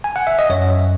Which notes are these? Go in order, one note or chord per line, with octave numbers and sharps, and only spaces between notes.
G#5
F#5
E5
D#5
F#2 C#5